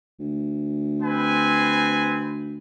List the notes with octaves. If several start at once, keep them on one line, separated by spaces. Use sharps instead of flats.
D2
C4 B4 G#5